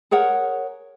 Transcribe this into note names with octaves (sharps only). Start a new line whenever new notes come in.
G#4 A#4 C#5 F#5